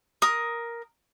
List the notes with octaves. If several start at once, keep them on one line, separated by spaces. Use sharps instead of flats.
A#4 D#6